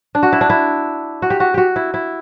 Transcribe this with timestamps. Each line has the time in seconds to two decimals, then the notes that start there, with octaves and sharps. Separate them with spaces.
0.15 D4
0.23 F#4
0.33 E4
0.41 D4
0.50 E4
1.22 F#4
1.30 G4
1.40 F#4
1.54 F#4 G4
1.76 E4
1.94 E4